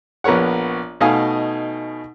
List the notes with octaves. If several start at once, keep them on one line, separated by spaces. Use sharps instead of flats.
A#1 B3 A#4 C#5 F#5
B2 A3 D#4 D#5 F5 G#5